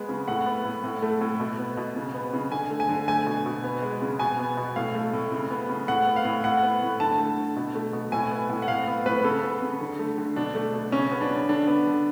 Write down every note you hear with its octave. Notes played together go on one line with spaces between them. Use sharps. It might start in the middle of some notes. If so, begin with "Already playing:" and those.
Already playing: G#3 B3
C#3
A2 F#5
B3
A2
A2
A3
A2
B2
B3
B2
C#3
B3
C#3
D3 G#5
A3
G#5
D3
A3 G#5
B2
B2
B3
G#3
C#3
B2 G#5
B3
B2
A2 F5
A3
A2
C#3
B3
C#3
A2 F#5
B3
F5
A2
A2 F#5
B3
A2
D3 A5
A3
D3
B2
A3
B2
A2 G#5
B3
A2
F#5
A2 F5
B3
A2 B4
C#3 A4
B3
C#3
D3
A3
D3
B2 D4
A3
B2
C#3 C#4
B3
D4
C#3
D3 D4
B3
D3